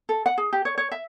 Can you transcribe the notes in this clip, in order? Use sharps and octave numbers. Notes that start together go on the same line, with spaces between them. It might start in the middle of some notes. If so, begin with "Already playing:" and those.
A4
F#5
G#4
G4
C#5
C#5
E5